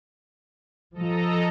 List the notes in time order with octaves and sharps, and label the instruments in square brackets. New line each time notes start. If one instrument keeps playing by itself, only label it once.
[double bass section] F3 [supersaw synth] A4 D#5 A#5